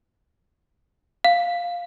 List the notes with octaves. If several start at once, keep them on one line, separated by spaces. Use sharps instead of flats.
F5